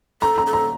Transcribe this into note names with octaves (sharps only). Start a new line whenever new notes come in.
A4 A#5
A#5
A4
A#5